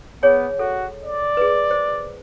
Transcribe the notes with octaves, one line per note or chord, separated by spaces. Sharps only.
B3 G#4 C#5 G#5
F#4 A4
D5
G#4 B4
C5